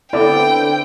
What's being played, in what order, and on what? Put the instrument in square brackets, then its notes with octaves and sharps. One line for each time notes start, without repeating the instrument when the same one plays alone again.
[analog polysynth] D3 B3 C4 [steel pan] E4 D5 [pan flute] A4 [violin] G5